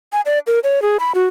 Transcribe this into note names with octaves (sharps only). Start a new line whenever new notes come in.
G#5
D5
A#4
C#5
G#4
B5
F#4